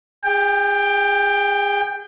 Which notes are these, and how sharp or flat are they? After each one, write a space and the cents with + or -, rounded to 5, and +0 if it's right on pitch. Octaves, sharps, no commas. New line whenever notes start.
G#4 -30 G5 +10